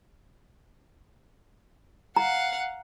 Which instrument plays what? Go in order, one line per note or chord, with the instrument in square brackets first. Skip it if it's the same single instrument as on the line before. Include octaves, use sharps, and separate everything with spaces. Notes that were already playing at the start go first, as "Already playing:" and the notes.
[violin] F5 F#5 [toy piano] A#5